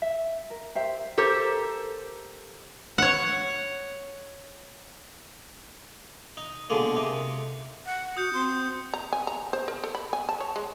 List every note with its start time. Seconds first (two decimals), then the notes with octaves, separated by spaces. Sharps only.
0.02 E5
0.50 A#4
0.75 G4 C5 E5 G5
1.18 G4 A4 A#4 C5
2.98 C#5 F#5
6.37 D#4
6.70 B2 D3 G#3 A#3
6.96 C3 D#4
7.85 F#5
8.17 F#4 D#6 G6 C#7
8.34 C4 C6
8.94 A#5
9.13 G#5
9.27 A#5
9.53 C5
9.68 A#4
9.84 A4
9.95 B5
10.13 G#5
10.29 A5
10.40 C#5
10.56 G#3